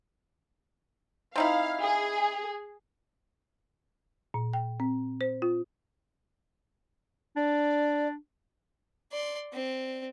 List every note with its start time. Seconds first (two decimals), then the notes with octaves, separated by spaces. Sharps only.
1.36 C4 D#4 E4 F5
1.82 G#4
4.34 A#2
4.53 G5
4.80 C4
5.21 C5
5.42 F4
7.36 D4 D5
9.12 D5 C6
9.53 C4